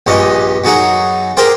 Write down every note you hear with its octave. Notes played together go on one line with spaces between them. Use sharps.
A#1 G2 C#4 D#5
F#2 F#3 D#4 G#4 F#5
G4 G#4 A#4 C5 G5